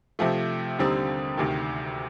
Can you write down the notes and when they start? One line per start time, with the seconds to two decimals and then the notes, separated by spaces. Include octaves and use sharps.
0.19 C3 F3 A3
0.79 D#2 D3 G3 C4 D#4
1.37 D2 C3 D#3